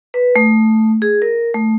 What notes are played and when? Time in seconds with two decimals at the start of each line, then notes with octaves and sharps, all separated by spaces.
0.14 B4
0.36 A3
1.02 G#4
1.22 A#4
1.54 A3